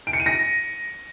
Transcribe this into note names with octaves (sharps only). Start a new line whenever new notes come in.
D7
C#7
D#7
A#6